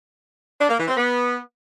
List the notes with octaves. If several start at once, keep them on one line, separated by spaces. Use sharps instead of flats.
D4
A#3
E3
C4
B3